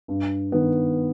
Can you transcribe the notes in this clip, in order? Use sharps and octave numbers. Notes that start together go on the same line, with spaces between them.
G2
D#3 B3